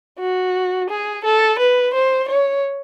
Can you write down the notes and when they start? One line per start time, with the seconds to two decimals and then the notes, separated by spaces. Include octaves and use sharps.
0.20 F#4
0.90 G#4
1.25 A4
1.59 B4
1.94 C5
2.28 C#5